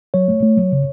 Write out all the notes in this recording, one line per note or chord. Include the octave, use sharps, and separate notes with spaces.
F#3 C#5
A3
A3
F#3
C#3